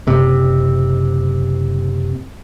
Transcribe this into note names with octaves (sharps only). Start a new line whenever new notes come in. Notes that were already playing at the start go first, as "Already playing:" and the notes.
F#1 C3